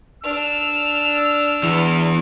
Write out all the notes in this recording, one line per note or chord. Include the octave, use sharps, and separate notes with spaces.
D4 E6 F6
E2 E3